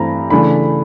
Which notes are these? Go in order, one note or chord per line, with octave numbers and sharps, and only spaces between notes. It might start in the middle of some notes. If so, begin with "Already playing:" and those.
Already playing: G2 E3 A3 C4 A#5 B5
C#3 E3 A3 D4 B5